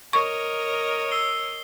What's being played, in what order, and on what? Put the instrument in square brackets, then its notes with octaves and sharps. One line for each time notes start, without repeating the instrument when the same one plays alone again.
[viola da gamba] A#4 C#5 D#5 [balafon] C#6
[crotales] E6 C7 G7